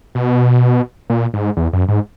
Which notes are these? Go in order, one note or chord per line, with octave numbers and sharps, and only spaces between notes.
B2
A#2
G#2
E2
F#2
G#2